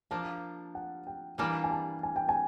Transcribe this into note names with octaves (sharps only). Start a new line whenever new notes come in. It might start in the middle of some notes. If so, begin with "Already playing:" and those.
F3 A#3 D4 A5
F#5
G5
E3 G3 A#3 D4 G#5
G#5
A5
G#5
G5
G#5